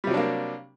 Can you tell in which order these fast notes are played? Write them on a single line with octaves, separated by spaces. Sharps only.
G3 C3 F#3 D4 A#3